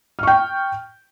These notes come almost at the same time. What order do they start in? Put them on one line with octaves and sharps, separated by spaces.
F6 C#6 G5